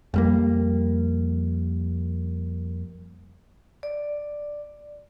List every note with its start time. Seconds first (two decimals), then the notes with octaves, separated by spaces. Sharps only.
0.14 F2 G3 A#3
3.83 D5